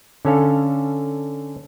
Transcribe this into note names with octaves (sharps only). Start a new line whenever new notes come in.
D3 C#4 A4 F5